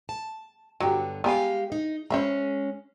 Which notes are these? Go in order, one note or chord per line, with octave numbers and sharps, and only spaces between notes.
A5
G2 D3 F#3 B3 G4
G#3 B3 G4 B4 F5 G#5
D#4
G#3 C#4 C5 E5 B5